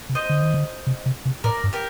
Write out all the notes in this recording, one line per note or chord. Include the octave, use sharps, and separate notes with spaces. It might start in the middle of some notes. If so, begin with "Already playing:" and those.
C3
C5 D#5
D3
D#3
D3
C3
C3
C3
A2 A#4 D5
G2
G4 A#4